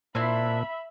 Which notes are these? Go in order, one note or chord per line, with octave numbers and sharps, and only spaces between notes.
A#2 C4 D4 E4 E5 B5